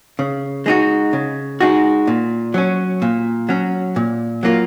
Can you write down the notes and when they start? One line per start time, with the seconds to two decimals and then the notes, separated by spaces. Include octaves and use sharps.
0.19 C#3
0.66 G#3 D#4 F#4
1.13 C#3
1.61 G#3 D#4 F#4
2.07 A#2
2.54 F#3 C#4
3.02 A#2
3.49 F#3 C#4
3.96 A#2
4.43 F#3 A#3 F4